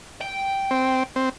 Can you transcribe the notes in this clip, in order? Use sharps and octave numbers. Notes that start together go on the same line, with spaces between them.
G5
C4
C4